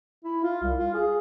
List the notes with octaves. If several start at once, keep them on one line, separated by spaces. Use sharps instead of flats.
E4
F4
C2
F4
G#4